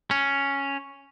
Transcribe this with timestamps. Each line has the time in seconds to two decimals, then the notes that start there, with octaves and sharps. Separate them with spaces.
0.11 C#4